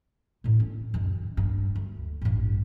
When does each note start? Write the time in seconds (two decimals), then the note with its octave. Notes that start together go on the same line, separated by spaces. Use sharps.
0.44 A2 D3
0.60 C#4
0.94 F#2 D#3
1.37 G2
1.75 D2
2.22 A1 G2